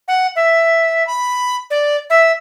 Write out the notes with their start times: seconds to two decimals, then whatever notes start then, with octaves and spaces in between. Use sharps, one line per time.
0.08 F#5
0.36 E5
1.07 B5
1.71 D5
2.10 E5